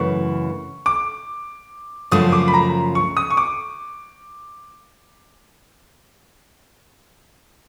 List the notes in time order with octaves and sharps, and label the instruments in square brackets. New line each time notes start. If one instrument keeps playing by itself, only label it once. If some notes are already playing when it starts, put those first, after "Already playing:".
Already playing: [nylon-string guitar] F#2 C#3 E3 A3 [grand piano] C#6
[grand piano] D6
[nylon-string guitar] F#2 C#3 F3 A3 [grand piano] D#6
[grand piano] D6
B5
A#5
C#6
D#6
C#6
D6